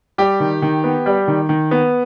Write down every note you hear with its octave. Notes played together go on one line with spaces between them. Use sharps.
G3 G4
D#3
D#3
B3
G3
D#3
D#3
B3